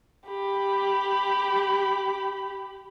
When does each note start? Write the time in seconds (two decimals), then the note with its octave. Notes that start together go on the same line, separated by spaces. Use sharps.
0.28 G4 B5